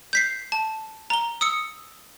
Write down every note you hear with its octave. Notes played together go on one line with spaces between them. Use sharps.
G6 B6 C7
A5
A#5 G7
D#6 E6 C#7